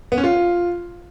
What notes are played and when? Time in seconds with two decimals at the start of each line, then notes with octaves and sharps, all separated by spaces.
0.12 B3
0.18 C#4
0.24 F4